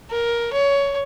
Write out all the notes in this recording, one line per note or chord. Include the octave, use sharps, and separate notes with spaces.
A#4
C#5